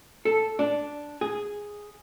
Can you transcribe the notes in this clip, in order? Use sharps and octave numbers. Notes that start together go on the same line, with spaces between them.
A4
D4
G#4